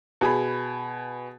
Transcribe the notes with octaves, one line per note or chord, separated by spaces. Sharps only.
B2 G#4 B5